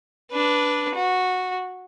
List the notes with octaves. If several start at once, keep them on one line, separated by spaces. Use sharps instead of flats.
D4 B4
F#4